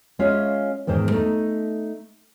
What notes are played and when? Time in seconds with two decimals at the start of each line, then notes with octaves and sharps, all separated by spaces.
0.19 G#3 C#4 F4 C#5 E5 F5
0.87 E2 G#2 D#3 C5
1.11 A3 D#4